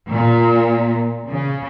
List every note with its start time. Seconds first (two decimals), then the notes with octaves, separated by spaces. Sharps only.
0.12 A#2
1.28 C#3